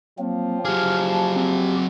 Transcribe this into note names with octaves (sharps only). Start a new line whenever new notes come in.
F3 F#3 A#3 C4
F#3 G4 G#4 F6
A5
C4